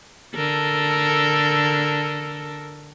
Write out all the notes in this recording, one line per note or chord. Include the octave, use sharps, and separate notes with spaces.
D3 A4 A#4